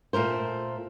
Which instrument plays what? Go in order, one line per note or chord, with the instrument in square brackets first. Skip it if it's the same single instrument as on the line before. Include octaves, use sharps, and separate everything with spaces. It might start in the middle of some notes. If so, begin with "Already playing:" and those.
[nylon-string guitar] A#2 A3 A#4 C5